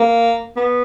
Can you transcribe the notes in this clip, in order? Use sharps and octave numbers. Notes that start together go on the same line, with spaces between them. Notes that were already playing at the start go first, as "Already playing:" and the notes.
Already playing: A#3
B3